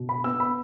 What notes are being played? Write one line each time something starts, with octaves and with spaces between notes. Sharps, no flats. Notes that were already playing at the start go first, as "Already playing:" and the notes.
Already playing: B2
B5
B3 E6
B5